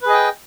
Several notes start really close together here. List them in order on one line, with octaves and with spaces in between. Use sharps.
B4 G#4 D#5 G5